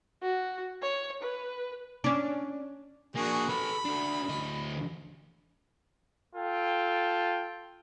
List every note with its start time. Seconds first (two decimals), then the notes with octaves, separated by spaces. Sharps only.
0.22 F#4
0.82 C#5
1.22 B4
2.04 C#4 D4
3.16 A#3 D4 F#4 G#4
3.49 A4 B4 B5
3.85 D4 F#4
4.29 D2 D#5
6.35 F4 A4 G5